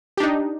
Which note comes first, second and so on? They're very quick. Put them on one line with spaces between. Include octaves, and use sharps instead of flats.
G4 D4 D#4